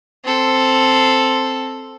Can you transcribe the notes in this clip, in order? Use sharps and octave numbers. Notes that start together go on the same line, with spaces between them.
C4 A4